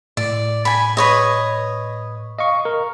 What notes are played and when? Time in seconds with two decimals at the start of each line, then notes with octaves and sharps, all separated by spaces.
0.17 A2 D5
0.65 G#5 B5
0.97 B4 C#5 D#5
2.39 D#5 F5 C#6
2.65 A#4